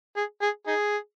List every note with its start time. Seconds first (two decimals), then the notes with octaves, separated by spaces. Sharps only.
0.16 G#4
0.42 G#4
0.67 D#4 G#4